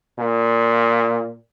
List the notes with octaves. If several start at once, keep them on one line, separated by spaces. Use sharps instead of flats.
A#2